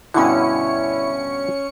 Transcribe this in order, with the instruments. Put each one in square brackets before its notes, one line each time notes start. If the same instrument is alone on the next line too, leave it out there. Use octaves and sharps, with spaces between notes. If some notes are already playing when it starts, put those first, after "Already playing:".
[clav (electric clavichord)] G2 B2 D3 [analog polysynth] C#4 C#7 [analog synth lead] E4